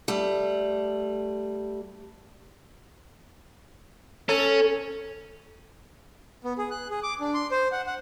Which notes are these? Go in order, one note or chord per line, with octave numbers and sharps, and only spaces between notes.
G3 A3
C#4 A4
B3
G#4
F#6
G#4
D6
D4
C6
C5
F#5
F#5